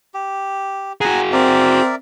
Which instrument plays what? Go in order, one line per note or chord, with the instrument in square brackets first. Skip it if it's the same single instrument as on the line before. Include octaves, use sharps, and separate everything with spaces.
[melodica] G4
[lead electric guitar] F#4 G#4 [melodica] F#5 G#5 A#5
[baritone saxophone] C4 [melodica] A#4 D5 E5